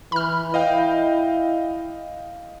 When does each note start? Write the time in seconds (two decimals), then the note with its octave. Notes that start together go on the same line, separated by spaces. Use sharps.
0.12 E3 B5 F6
0.54 E4 D#5 F5 G5